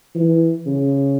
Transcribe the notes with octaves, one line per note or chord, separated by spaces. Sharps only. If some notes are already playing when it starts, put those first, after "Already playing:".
E3
C#3